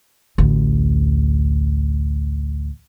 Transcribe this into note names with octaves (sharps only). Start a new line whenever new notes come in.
A1 D2